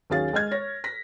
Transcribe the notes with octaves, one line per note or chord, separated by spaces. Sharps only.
D#2 F#3 C#4 G#4 F5 A6
G#3 D#5 F6 G#6
C#5 A#6
A#6 B6